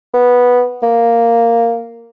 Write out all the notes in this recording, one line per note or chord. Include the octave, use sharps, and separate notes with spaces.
B3
A#3